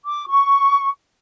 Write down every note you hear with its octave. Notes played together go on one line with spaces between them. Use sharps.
D6
C#6